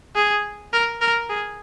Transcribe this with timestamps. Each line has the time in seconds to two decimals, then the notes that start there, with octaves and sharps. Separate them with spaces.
0.15 G#4
0.73 A#4
1.01 A#4
1.29 G#4